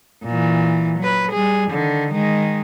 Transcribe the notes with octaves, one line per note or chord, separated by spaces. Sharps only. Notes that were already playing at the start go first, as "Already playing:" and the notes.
A#2 E3
F#3 B4
G3 G#4
D3 D#3
D#3 G#3